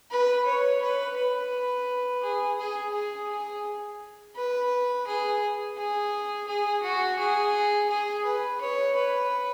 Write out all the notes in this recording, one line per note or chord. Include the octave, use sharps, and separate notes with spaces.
B4
C#5
B4
B4
G#4
G#4
G#4
G#4
B4
G#4
G#4
G#4
F#4
G#4
G#4
B4
C#5
B4